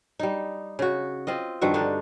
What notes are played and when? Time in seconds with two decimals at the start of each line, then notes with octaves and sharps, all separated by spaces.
0.19 G3 D#4
0.79 C#3 F#4
1.27 C4 F4 D#5
1.61 G2 D#3 F3 F#4
1.74 D3 D4 D#4